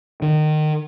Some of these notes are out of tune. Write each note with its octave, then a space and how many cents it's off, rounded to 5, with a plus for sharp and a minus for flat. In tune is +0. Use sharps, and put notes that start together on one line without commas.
D#3 -25